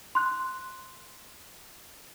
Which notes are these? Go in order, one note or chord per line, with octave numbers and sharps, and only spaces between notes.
C6 F#6